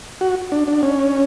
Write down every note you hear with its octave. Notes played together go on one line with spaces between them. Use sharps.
F#4
D4
D4
C#4